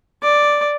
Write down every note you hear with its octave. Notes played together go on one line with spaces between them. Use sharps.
D5